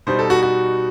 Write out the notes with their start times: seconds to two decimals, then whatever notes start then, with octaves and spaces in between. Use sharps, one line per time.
0.07 B2 G3 D#4 C5
0.19 A4
0.30 F#4
0.43 F#4